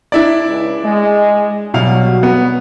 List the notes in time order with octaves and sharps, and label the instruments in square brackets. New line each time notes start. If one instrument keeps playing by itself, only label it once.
[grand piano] D4 E4 D5
[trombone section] C#2
G#3
[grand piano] B2 F5 [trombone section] F#3 G3
[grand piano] B3